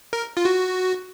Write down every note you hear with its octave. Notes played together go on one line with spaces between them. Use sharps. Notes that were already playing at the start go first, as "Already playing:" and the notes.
A#4
F4
F#4